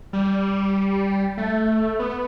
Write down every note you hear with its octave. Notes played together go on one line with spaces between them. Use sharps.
G3
A3
B3